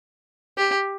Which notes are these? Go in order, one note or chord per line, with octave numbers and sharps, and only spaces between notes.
G4